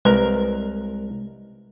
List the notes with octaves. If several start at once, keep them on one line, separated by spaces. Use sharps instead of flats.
C2 G#3 A#4 B4